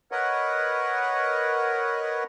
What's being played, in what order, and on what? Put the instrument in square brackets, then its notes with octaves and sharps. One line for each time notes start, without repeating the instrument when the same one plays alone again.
[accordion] A#4 B4 C#5 D#5 F#5